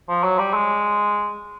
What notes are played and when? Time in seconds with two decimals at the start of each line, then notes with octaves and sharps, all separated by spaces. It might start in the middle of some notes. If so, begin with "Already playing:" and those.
0.09 F3
0.24 F#3
0.39 G3
0.54 G#3